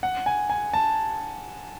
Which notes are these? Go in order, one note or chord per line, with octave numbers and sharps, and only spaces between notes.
F#5
G#5
G#5
A5